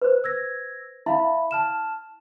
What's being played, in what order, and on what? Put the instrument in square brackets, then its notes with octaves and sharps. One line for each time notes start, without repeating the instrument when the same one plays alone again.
[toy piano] B4 C5
[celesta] E6 G#6 A#6
[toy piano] E4 [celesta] E5 F5 B5
[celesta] A5 F6 E7